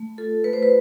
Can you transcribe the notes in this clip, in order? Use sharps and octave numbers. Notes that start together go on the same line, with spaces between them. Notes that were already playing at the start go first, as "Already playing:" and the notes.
Already playing: A3
F4 A4
A3 B4
C5
B4